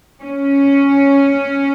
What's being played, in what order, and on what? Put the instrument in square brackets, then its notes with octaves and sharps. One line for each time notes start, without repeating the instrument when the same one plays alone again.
[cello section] C#4